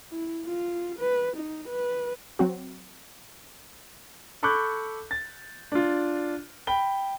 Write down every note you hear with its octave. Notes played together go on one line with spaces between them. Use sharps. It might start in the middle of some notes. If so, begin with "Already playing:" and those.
E4
F4
B4
D#4
B4
F#3 C4 F#4
A4 B5 C#6 D6 F#6 G6
A6
D4 F4
G5 B5 G7